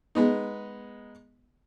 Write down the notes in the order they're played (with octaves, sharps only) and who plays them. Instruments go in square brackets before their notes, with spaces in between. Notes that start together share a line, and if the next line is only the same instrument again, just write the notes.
[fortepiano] G#3 B3 D#4